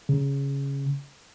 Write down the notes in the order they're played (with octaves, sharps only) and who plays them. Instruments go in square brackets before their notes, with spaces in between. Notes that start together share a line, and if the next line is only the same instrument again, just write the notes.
[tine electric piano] C#3